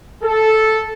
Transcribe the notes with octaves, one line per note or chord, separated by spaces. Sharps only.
A4